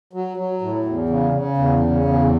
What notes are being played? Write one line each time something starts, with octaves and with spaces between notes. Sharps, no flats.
F#3
F#3
A2
E2
C#3
C#3
E2
C#3
E2